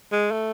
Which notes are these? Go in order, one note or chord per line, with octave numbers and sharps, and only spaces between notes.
G#3
A3